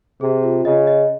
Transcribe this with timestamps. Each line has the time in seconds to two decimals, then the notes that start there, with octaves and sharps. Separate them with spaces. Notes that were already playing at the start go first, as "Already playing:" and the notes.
0.21 C3 G#4
0.44 F4
0.65 C#3 D#5
0.87 D#5